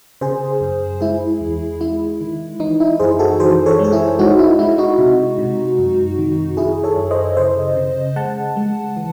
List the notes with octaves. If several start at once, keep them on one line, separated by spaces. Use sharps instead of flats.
C#3 G#4 C5
F#2
G#3 E4 G#4
E2
G#3 E4
D#3
E3 D#4
E4
F#2 G#4 C5
F#4 A4
E3 G#4 C5
A4 C#5
G#3 A4
E4 G#4
G#3 D#4 F#4
E4
G#3 E4
D#4 F#4
C3
C3
F#2
D#3
F#2 E4 G#4
A4 C#5
F#2
C5 D#5
C#3 C5 D#5
C#3
G#3 F#5 A5
G#3
E3